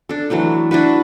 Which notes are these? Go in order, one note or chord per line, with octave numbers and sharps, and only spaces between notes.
D4 A4
E3 F#3 A3 D4
D4 E4 F#4 B4